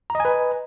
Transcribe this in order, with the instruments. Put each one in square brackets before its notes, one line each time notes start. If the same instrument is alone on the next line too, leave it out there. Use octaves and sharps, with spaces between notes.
[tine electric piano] A#5
D#5
G#5
B4